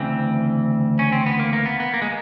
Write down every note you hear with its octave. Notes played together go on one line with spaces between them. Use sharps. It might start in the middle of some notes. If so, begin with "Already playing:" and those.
Already playing: D2 C#3 E3 C4
C#4
C4
B3
A#3
A#3
B3
B3
A#3
G#3